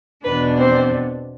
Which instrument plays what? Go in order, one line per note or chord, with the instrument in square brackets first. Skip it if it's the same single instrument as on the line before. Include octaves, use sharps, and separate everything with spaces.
[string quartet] E2 B2 B3 D4 B4
C4 C5